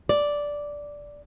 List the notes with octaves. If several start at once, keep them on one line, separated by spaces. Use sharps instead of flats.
D5